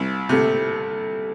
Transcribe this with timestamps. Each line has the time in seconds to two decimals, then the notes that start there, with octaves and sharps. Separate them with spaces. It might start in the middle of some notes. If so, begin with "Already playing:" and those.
Already playing: C2
0.29 C3 A3